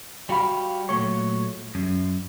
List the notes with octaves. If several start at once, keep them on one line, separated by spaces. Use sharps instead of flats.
G3 F#4 F5 B5
A#2 F#3 A3 C#5
F#2